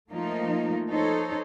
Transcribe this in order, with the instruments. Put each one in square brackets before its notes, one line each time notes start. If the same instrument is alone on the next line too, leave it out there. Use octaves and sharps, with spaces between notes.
[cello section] F3 A3 A#3 D#4 F4
D#4 A4 C5 C#5